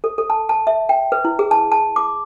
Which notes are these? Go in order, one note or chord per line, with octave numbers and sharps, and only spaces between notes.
A4
A4
A5
A5
E5
G5
B4
E4
G#4
A5
A5
D6